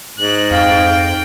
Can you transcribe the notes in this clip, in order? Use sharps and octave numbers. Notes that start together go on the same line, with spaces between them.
G#2 F#6
F2 F5 G5